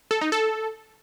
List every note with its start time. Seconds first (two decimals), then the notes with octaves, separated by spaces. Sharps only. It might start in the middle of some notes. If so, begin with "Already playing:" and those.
0.11 A4
0.21 D#4
0.32 A4